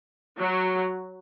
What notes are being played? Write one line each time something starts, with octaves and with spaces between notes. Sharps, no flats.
F#3